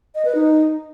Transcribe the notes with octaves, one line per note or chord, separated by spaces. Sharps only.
D#5
B4
D#4